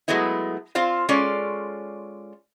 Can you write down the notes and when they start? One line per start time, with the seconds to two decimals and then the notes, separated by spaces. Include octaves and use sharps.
0.08 F#3 G#3 A3 B3 E4
0.75 C4 F4 C5 F5
1.09 G#3 C#4 F4 A4 D5